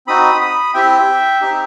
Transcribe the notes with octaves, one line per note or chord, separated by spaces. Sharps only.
C4 D#4 F#4 B5 D#6
B5 D#6
C4 E4 G4 E5 G5
C4 D#4 G4